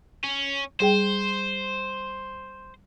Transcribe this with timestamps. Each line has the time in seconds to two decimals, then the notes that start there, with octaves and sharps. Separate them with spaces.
0.24 C#4
0.80 G3 G#4 C5 G5